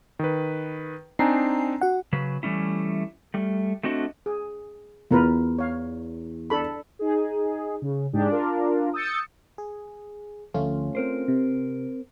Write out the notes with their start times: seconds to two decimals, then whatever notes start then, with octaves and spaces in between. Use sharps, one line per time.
0.19 D#3 B4
1.19 C4 D4 D#4 G#5 A#5 C7
1.81 F#4 F#5
2.13 C#3 F#3 B4
2.43 E3 G3 A3 C#4 E4
3.34 G3 A3
3.83 A3 C4 D4 F#4 D#5
4.26 G#4
5.11 E2 F4 A#4 B4
5.59 C#5 F5
6.50 D4 A4 B5
6.99 D#4 G#4
7.82 C#3
8.13 G#2 G#3 D4 G4 G#4
8.28 D4 F4 A#4
8.94 D#6 E6 G6 A6 C#7
9.58 G#4
10.54 D2 F3 A3 C#4 F4
10.95 C4 A#4 C5
11.28 C3